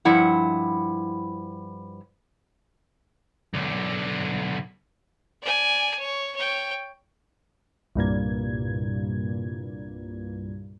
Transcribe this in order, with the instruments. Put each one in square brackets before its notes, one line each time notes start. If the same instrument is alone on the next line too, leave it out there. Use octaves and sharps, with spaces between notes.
[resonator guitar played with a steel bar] G2 F3 E4 F#5
[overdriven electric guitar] B1 D3
[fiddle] D5 G#5
C#5
C#5 G5
[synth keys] C2 G2 A#2 G#6